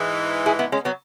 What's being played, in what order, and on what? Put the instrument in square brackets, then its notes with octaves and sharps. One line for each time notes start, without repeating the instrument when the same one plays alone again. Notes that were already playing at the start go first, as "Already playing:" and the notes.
Already playing: [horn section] G#2 E3 G#3
[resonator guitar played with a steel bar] E4 G#4
B3 E4
G#3 C#4
F#3 B3